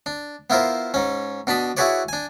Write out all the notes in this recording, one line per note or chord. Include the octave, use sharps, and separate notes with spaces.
D4
B3 E4 F4 A#4 C5
G#2 C#4
B2 D4 A5 B5 D#6
E4 F#4 G#4 B4 C#5 D5
D4 G#5